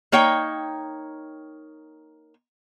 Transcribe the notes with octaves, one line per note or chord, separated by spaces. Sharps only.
A#3 D#4 C#5 G5